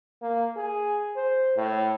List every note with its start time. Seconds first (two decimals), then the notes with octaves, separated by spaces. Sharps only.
0.22 A#3
0.56 G#4
1.16 C5
1.57 A2